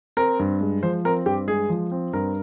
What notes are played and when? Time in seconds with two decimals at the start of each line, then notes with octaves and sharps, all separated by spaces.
0.17 C4 A#4
0.39 G2
0.61 G#3
0.83 F3 C5
1.05 C4 A#4
1.26 G2 G4
1.48 G#3 G#4
1.69 F3
1.92 C4
2.13 G2 A#4